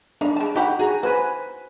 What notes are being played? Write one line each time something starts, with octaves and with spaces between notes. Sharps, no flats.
D4 D#4 F5
G#3 A5
D#4 F#4 G4 F#5
F#4 G#4 A#5
F#4 B4 C5 G#5